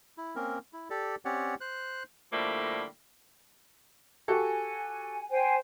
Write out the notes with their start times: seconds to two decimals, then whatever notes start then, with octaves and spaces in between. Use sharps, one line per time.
0.17 E4
0.36 A#3 C4 C#4 A#4
0.73 E4
0.90 G4 A4 D5
1.25 C4 C#4 G4 C#5 D5 F#5
1.61 C5 F#6
2.32 A2 D3 F3 G3 A3 A#3
4.28 F#4 G4 A4 G#5
5.29 C5 G5 G#5